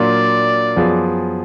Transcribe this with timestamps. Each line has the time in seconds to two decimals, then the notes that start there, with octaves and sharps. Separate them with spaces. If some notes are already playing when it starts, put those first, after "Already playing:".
Already playing: A#2 F#3 A#3 D4 F4 D5
0.76 F#2 F3 B3 F4 G#4